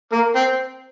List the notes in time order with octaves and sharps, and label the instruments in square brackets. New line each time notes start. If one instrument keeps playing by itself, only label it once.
[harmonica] A#3
C4